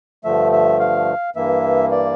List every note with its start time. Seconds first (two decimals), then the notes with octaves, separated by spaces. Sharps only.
0.24 G2 D3 F3 A3 E5
0.52 E5
0.80 F5
1.35 G2 E3 A#3 E5
1.91 D5